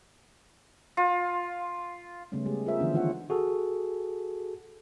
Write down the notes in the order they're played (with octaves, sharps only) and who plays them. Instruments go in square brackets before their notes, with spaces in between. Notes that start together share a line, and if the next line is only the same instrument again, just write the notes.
[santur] F4
[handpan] C#3 G3 A3 B3 C#4
G#3 G4 G#4
F4 G#4 A#4 C5 E5
D3 E3 F3 B3 C#4 D4
D#3 F4 C#5 F#5
[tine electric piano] F#4 G#4 A4